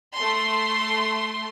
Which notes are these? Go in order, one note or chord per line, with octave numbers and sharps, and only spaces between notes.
A3 C6